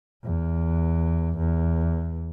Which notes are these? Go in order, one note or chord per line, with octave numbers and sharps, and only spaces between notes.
E2
E2